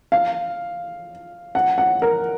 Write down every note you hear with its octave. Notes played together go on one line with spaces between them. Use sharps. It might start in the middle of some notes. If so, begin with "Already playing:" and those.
F5
F#5
F#5
A#4